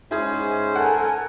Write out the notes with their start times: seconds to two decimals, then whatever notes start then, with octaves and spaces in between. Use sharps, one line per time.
0.11 G#2 C#4 E4 G#4 C5
0.76 A4 A#4 F#5 G#5